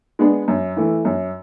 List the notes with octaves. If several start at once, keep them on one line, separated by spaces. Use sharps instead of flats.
G#3 B3 D4
F#2
E3 A3
F#2